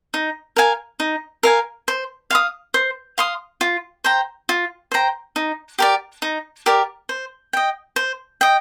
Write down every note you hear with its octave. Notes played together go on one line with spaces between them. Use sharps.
D#4
A#4 F5 G#5
D#4
A#4 F5 G#5
C5
F5 C6 D#6
C5
F5 C6 D#6
F4
C5 G5 A#5
F4
C5 G5 A#5
D#4
G4 A#4 D5
D#4
G4 A#4 D5
C5
D#5 G5
C5
D#5 G5